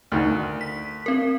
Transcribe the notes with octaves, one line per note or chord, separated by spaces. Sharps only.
D2 D#3
B6
C4 A#4